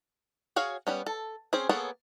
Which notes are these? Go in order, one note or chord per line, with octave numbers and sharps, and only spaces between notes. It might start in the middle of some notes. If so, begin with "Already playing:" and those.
F#4 G#4 C#5 F5
G3 B3 C#4
A4
C4 C#4 G#4 C5
A#3 B3 G#4 A4 C#5